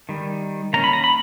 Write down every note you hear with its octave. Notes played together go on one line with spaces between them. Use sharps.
D#3 G3
D#3 A#3 C#4 A#5
B5
A#5
B5